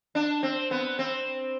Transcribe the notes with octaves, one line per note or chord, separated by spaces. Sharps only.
D4
C4
B3
C4